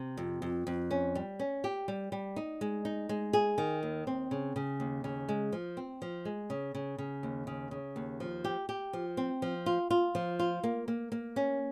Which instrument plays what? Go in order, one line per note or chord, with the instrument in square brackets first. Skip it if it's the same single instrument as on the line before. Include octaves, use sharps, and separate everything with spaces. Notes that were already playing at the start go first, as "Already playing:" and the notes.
Already playing: [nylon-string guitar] C3
F2
F2
F2
C#4
G3
C#4
G4
G3
G3
D#4
G#3
D#4
G#3
G#4
D#3
D#2
C4
C#3
C#3
D#2
C#3
G#3
F3
C4
F3
G#3
C#3
C#3
C#3
D#2
C#3
C#3
D#2
F3
G4
G4
F3
C4
F3
F4
F4
F3
F4
A#3
A#3
A#3
C#4